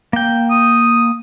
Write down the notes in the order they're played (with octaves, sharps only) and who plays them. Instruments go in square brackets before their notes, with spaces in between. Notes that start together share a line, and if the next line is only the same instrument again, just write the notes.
[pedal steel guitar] A#3 G5
[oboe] D#6